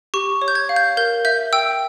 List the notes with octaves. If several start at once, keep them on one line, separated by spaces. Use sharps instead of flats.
G4 C#6
C#5
G6
G#6
F5
G6
A#4 G6
E5 G6
G5 E6